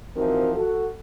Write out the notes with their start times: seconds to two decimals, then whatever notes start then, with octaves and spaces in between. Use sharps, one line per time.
0.16 E3 F3 C4 D#4 F#4 A#4
0.55 F#4 A4